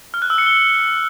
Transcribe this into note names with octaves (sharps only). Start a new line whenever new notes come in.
F6
F#6
E6
C#7
G7